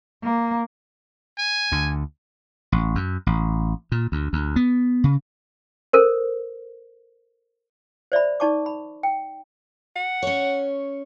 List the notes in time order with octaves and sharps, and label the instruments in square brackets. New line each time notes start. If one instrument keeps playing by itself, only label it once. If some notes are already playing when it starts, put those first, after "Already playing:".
[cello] A#3
[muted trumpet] G#5
[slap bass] D2 D3
A1
F#2
A1
A#2
D2
D2
B3
C#3
[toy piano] A4 A#4 C5
C5 D5 E5 B5
D#4 D5 A5 C#6 D6
B5
G5
[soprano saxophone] F#5
[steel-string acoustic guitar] C#4 C#5